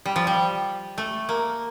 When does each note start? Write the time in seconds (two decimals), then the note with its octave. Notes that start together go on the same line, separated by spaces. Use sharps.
0.06 G3
0.16 F3
0.27 G3
0.98 A3
1.29 A#3